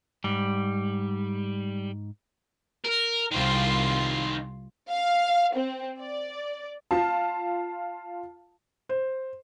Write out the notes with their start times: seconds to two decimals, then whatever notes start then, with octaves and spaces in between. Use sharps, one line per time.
0.24 G#2 G3
2.85 A#4
3.32 C2 D#3 F4 C5 C6
4.91 F5
5.56 C4
6.01 D5
6.91 F4 F5 A5
8.89 C5